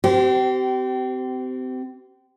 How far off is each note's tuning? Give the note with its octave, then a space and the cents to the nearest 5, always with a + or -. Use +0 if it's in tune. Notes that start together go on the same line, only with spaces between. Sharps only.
C4 -30 G4 -35 C5 +0